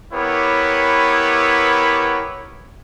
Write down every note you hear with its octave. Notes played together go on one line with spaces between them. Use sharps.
B3 E4 G4 A#4 B4 C#5